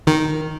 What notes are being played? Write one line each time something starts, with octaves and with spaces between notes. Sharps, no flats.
D#3